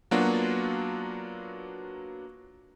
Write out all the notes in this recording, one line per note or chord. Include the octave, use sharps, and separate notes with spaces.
F#3 A#3 B3 D4 F4 F#4